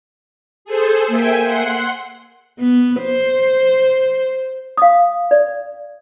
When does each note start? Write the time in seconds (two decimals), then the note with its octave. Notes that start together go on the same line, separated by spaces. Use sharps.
0.65 G#4 A4 C5
1.09 A#3 E5 G5 G#5
1.43 F#5 C6
2.59 B3
3.02 C5
4.77 F5 D#6
5.31 D5